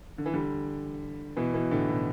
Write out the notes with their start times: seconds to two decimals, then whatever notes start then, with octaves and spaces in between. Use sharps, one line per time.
0.18 D3
0.26 E3
0.34 D3 G3
1.36 B2 E3
1.54 B2 E3
1.71 A2 D3
1.89 B2